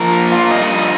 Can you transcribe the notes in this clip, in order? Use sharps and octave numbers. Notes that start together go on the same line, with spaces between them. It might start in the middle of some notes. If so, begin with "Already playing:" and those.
Already playing: F3 A#4
A#3
F4
G2 D#5
F3